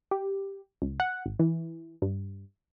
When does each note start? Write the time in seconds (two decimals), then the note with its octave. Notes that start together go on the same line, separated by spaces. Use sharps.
0.11 G4
0.82 C#2
1.00 F#5
1.26 G#1
1.39 E3
2.02 G2